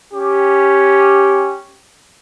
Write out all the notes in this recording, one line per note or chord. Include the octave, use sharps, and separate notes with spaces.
C#4 G4